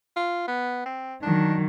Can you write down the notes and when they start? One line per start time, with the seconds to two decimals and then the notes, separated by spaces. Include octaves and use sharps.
0.16 F4
0.48 B3
0.86 C4
1.23 D#3 F#3 D4